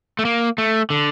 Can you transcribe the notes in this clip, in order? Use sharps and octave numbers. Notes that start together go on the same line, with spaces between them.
A3
A#3
A3
D3